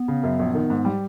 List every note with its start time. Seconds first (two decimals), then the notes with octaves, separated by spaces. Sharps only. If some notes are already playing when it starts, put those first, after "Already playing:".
Already playing: B3
0.08 C#3
0.23 F#2
0.39 A#1
0.55 D#3
0.70 G#2
0.85 G3